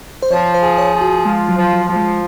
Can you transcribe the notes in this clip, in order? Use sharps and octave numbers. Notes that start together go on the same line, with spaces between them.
C5
F3 C#5
C5
G#4
C#5
F3
F#4
G#3 F4
F#3
F3
F#3
F3 F#3
G#3